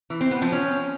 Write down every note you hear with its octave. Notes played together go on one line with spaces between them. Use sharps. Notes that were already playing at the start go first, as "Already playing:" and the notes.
E3
C4
B3
F3
C#4